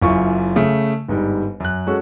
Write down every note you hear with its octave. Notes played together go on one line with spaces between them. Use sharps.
F#1 F#2 E4 F4 C#6
C#3 A3
G1 G#2 G3
F#2 F#6
G#3 C#4 F#4 A4